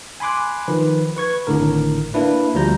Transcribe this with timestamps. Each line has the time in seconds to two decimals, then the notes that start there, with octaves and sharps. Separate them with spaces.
0.20 G#5 B5 C6 D6 F#6
0.68 D#3 F3 B4
1.16 B4 C#6 G#6
1.47 G#1 A2 D3 A#4
2.14 A#3 D4 E4 B4
2.54 D2 F3 G3 A#5 G6